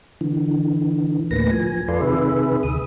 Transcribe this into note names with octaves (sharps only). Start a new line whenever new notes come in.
D3 E3
D2 A2 A#3 B4 A#6
F3 G#5
F2 F4 A4 B4 D5 C6
C3 D#3 G#4 B4 E5
D2 D#6